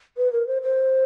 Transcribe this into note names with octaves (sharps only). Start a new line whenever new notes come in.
B4
A#4
C5
C5